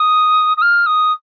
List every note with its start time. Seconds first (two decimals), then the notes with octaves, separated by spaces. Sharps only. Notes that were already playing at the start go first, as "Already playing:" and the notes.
Already playing: D#6
0.57 D#6
0.62 F6
0.86 D#6